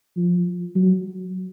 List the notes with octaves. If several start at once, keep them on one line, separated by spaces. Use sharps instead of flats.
F3
F#3